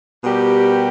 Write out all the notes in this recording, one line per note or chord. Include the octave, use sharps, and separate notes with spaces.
B2 G3 B3 G4 A#4